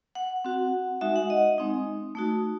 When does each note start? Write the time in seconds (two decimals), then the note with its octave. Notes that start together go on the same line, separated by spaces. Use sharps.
0.15 F#5
0.45 C4 F#4
1.01 G#3 D#4 F#4 E5
1.16 F#5
1.30 D#5
1.58 G#3 C4 D#4
2.15 A3 D#4 F#4